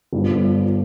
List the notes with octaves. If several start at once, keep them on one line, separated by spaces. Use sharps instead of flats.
G1 G2 F3